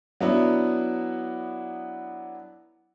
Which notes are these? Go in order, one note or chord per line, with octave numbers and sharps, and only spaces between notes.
F#3 B3 D4 E4